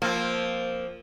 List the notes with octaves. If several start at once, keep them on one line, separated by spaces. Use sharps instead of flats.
F3 A#3 C4